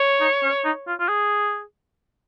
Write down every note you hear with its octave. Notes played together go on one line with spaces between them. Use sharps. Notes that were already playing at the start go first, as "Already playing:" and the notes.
Already playing: C#5
D#4
C#4
D#4
F4
F4
G#4